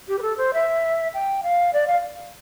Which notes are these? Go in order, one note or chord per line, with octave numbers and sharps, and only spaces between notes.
G4
B4
A4
C5
E5
G5
F5
D5
F5